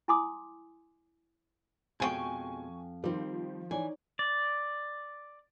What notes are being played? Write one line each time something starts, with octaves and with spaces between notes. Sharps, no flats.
E4 G#5 C6 D6 D#6
F2 B2 F3 G#3 F4 G5 G#5 C#6
D#3 F3 G3 C4
E3 D#4 C#5 D5 G#5
D5